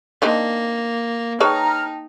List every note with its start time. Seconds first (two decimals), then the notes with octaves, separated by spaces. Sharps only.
0.22 A#3 C4 D4 D#4
1.40 D#4 G#4 B4 C#5 G5 A5 A#5 F6